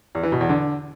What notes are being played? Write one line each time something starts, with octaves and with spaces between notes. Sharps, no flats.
E2
E3
B2
E2
D3